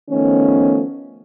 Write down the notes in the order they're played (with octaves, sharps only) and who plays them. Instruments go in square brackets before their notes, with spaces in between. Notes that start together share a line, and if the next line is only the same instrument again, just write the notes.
[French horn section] D#3 F3 A3 B3 C#4